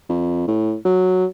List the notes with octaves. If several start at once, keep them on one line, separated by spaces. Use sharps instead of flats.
F2
A2
F#3